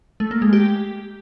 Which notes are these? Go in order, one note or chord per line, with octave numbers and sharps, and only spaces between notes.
A3
A#3
G#3
G4